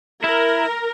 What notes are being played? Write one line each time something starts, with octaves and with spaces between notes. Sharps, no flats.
E4 A#4